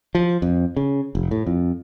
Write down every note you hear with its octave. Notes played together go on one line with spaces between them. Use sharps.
F3
F2
C#3
F1
A2
F2